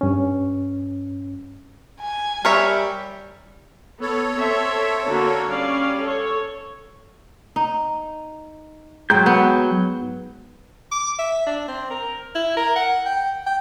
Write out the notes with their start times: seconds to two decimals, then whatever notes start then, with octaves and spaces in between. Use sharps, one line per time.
0.01 G2 C#4
2.00 G#5
2.45 G3 A#4 C#5 E5
4.01 B3 A4 C#5
4.37 C4 E5
5.06 D3 A#3 F#4
5.47 G3 C#4 D5 F5
6.02 A4 C#5
7.56 D#4
9.10 G#2 F#3 G5 G6
9.26 B3
10.91 D6
11.19 E5
11.46 D4
11.68 C4
11.90 A#4
12.35 E4
12.56 A#4
12.75 F#5
13.05 G5
13.46 G5